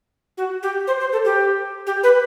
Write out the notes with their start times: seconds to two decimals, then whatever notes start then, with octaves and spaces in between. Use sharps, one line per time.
0.37 F#4
0.63 G4
0.87 C5
1.00 C5
1.12 A4
1.25 G4
1.87 G4
2.03 B4